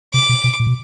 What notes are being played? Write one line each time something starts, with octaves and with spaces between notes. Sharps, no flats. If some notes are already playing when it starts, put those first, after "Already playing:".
C3 D6
B2
B2
A#2
B2